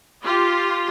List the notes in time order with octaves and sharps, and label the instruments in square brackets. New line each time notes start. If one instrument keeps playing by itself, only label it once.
[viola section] F4 G4